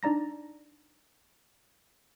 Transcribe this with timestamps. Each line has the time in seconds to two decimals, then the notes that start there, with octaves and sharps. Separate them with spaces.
0.03 D4 D#4 D5 A#5 A#6